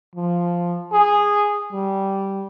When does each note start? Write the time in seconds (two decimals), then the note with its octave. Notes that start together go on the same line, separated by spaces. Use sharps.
0.15 F3
0.92 G#4
1.72 G3